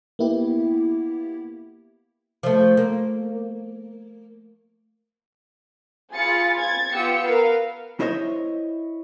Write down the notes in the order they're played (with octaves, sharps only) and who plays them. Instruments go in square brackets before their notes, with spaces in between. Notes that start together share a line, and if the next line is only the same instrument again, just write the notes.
[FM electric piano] A#3 B3 E4 G4
[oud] F3 A3
A#3
[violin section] F4 G#4 B5 A6 C#7
G#6 A6
B3 F4 G4 G5 E6 C#7
A#4 B4 F5
[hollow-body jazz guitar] E4 C5 C#5 D#5 E5